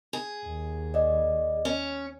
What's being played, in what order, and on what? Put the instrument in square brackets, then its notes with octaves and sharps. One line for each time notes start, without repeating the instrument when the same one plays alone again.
[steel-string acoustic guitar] G#4
[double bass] D#2
[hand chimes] D5 D#5
[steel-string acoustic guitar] C#4